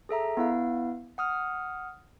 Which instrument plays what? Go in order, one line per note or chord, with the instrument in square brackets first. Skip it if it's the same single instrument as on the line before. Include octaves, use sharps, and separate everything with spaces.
[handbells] G#4 A4 E5 A#5
B3 E4 F5
F#5 D#6 F6